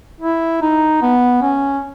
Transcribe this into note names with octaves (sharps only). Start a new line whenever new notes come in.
E4
D#4
B3
C#4